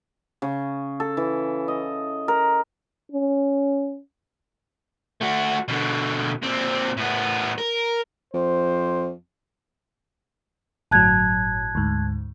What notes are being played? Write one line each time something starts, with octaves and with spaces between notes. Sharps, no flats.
C#3
A4
E3
D#5
A#4
C#4
A3 F#4
B2 D3
A#2 C4
A2 B3
A#4
F2 C5
G1 A2 F#3 A5 F#6 G#6
D2 G#2